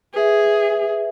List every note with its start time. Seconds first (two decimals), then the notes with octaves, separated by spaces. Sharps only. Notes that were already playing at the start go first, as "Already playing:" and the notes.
0.14 G#4 B4 E5